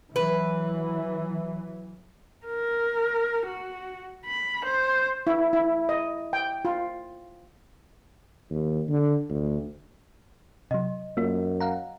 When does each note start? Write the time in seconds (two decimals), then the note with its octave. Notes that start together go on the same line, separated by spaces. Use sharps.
0.16 E3 F#3 B4
2.47 A#4
3.46 F#4
4.26 B5
4.65 C5
5.27 E4
5.53 E4
5.89 D#5
6.33 G5
6.65 F4
8.50 D#2
8.89 D3
9.29 D2
10.71 C3 F#3 D#5
11.17 F#2 A#3 F4
11.60 F5 F#5 A#5